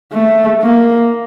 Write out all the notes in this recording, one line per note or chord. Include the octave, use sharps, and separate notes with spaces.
A3
A#3